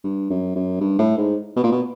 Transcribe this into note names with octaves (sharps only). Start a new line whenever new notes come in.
G2
F#2
F#2
G2
A2
G#2
B2
A#2
B2